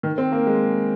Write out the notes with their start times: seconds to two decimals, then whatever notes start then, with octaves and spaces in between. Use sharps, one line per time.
0.03 D#3
0.18 C4
0.32 A#3
0.47 G#3